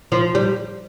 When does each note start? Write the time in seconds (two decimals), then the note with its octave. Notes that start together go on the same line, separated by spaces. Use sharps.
0.12 F3
0.35 G3